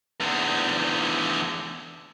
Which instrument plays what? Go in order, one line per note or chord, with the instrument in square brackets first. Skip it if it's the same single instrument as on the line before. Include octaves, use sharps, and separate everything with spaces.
[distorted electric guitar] E2 D3